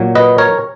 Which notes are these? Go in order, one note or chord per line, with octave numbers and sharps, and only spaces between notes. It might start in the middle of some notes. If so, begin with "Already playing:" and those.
Already playing: A#2 F#3
B4 D#5
A#4 C#5